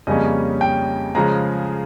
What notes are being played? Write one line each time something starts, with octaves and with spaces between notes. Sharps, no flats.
F2 C#3 G3 A#3 C#4 D#5
G5
C#3 F3 G#3 A#5